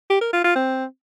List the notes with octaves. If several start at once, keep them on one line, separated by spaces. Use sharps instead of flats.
G4
A#4
F4
F4
C4